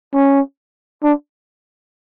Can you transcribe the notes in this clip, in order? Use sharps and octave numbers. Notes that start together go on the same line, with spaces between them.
C#4
D4